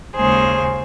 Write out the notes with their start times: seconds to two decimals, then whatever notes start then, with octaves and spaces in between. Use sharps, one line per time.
0.17 D#2 C#3 G#3 G#4 C5